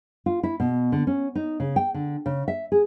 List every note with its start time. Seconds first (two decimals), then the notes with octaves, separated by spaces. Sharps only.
0.26 F4
0.43 E4
0.60 B2
0.92 D3
1.07 C#4
1.35 D#4
1.60 C#3
1.76 G5
1.94 D3
2.26 C#3
2.48 E5
2.72 G#4